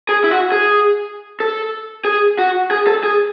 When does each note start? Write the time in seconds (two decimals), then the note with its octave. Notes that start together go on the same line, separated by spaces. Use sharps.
0.09 G#4
0.24 E4
0.31 F#4
0.52 G#4
1.40 A4
2.05 G#4
2.39 F#4
2.71 G#4
2.87 A4
3.04 G#4